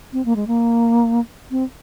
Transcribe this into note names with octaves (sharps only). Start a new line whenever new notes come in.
C4
A#3
G#3
A#3
C4